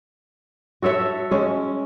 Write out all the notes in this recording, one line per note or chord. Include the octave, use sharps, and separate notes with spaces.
F#4 A4 C#5 E5
G#3 C#4